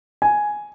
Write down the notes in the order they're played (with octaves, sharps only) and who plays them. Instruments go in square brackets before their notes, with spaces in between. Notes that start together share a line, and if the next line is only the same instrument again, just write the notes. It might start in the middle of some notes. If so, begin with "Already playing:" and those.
[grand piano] G#5